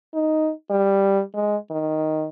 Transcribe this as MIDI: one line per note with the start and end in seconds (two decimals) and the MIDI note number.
0.14 0.50 63
0.70 1.21 55
1.34 1.56 56
1.70 2.27 51